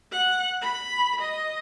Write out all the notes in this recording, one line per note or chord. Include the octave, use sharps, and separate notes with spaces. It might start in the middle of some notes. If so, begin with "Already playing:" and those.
F#5
B5
D#5